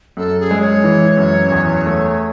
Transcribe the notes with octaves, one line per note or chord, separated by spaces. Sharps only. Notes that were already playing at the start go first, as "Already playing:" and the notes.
F#2 A4
G#4
G#3
C#5
E3
F#2
E2
A3